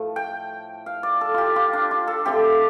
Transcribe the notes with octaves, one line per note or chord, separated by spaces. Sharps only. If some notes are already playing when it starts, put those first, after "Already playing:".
Already playing: A2 F3 A3
G5
F5
D5
A4
F4 G4
F4
D4
F4
A4
D3 A3 C4 G4